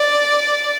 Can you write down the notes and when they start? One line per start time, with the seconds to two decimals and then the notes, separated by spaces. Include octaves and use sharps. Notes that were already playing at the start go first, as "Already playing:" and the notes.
Already playing: D5